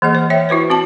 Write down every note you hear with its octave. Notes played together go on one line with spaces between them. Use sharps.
E3 A#3 G#4 D#5
C5
C#5 E5 G5
E4 F#4 B4 C5
C4 F#4 A5